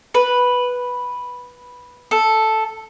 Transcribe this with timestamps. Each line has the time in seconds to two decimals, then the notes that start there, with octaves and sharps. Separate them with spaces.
0.14 B4
2.11 A4